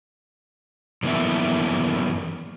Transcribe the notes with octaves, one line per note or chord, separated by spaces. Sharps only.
F#2 C3 E3 A#3 B3 E5